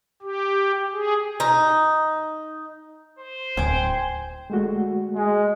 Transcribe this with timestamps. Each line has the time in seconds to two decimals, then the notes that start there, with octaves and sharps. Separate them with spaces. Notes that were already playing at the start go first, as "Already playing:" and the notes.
0.22 G4
0.93 G#4
1.40 D#4
3.19 C5
3.57 D1 G5 G#5
4.50 G#3 A3 F#4
5.16 G#3